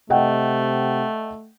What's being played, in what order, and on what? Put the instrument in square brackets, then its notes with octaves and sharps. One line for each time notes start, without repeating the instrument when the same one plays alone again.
[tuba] C3 [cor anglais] A3 [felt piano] D#5 F#5 G5